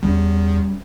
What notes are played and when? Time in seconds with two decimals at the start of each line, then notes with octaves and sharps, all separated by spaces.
0.03 E2 G3 G#3 C#4